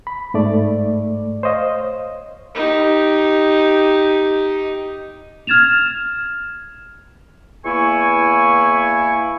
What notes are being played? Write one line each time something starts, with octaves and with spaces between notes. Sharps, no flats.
B5
G#2 A3 D5
C5 C#5 D#5 F5
D#4 G4
F6 G#6 A6 E7 F7
E2 A#3 E4 E5 G#5 C#6